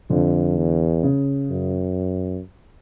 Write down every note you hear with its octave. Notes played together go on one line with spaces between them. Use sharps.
F2 D3
E2
C#3
F#2